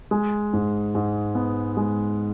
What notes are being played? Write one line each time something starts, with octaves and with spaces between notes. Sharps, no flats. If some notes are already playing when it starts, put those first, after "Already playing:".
G#3
G#2
G#2
B3
G#3